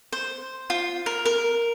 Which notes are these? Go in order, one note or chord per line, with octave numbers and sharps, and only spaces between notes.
C5
F4
A#4
A#4